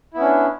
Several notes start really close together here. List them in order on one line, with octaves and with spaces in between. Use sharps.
E4 B3 C#4 D4